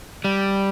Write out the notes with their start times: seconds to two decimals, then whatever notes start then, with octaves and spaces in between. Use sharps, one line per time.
0.25 G3